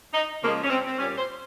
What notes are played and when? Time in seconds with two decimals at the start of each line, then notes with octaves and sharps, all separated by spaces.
0.13 D#4
0.42 C#3 F3 G#3 A#3
0.64 C#4
0.70 C4
0.87 C4
0.98 A#2 G3 C#4
1.18 C5